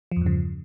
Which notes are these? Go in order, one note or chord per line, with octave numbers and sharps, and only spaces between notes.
E2 G2 C#3 F3